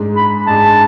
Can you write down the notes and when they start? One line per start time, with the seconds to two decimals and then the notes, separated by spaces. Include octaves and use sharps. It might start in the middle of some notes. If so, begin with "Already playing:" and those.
Already playing: G#2 G#3 D4 G#4
0.16 B5
0.47 G#2 G#3 D4 G#4 A5